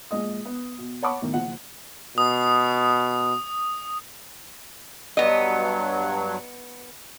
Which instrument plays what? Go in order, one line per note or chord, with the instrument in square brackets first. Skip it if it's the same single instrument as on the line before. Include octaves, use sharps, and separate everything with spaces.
[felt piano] A#1 G#3 D#5 D#6
B3
B2
C#5 F#5 A5 B5 C#6 D6
B1 A2 D#3
F#1 F3 F#5
[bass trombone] B2 [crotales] D#6
[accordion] G2 F#3 [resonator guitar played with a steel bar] B3 D#5